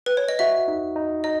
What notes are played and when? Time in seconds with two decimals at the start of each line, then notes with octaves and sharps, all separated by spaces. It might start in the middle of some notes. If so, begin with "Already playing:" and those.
0.06 B4
0.17 C#5
0.29 D#5
0.39 F#4 E5
0.68 D#4
0.96 D#4
1.24 D#4 D#5